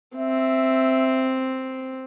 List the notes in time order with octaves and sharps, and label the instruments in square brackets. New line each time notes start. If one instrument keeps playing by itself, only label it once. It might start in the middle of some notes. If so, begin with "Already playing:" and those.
[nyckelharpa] C4 [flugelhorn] E5